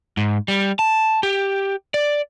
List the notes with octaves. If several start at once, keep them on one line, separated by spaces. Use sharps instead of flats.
G#2
G3
A5
G4
D5